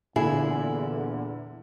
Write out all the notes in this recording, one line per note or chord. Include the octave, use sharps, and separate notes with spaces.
E2 A#2 D3 E4 G#4